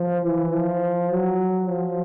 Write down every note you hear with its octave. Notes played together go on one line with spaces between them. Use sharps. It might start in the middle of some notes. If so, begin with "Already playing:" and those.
Already playing: F3
E3
F3
F#3
F3